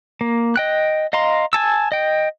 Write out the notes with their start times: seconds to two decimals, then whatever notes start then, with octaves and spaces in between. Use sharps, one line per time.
0.21 A#3
0.56 D#5 G5 F#6
1.13 D#5 F5 A#5 C6
1.53 G#5 A5 E6
1.92 D#5 G5